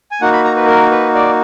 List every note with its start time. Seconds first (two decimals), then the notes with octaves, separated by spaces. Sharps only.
0.11 G#5
0.21 A#3 D#4 F#4 F#5
0.33 B5
0.44 A#5
0.56 B4
0.68 A#4
0.91 B4
1.15 D5